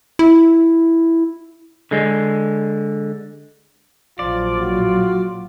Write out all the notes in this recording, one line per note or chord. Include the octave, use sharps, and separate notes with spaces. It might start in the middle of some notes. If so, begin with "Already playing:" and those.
E4
D3 G#3
A#1 F3 F#3 F4 D5
F#4